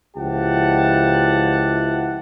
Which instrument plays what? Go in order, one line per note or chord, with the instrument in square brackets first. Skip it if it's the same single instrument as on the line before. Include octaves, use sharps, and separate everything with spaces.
[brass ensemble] C#2 F3 E4 G4 F#5 A5